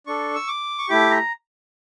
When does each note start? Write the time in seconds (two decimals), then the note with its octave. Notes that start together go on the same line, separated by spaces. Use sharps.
0.07 D4 A4 C#6
0.36 E6
0.48 D6
0.79 C#6
0.89 A3 E4 G4 D6
1.11 A#5